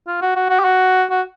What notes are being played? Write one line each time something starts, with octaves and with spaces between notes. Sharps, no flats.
F4
F#4
F#4
F#4
G4
F#4
F#4